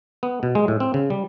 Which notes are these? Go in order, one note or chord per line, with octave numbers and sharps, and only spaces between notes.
B3
B2
G#3
A2
C4
C#3
G3